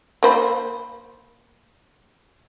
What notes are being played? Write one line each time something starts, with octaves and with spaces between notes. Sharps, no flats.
A#3 C5 B5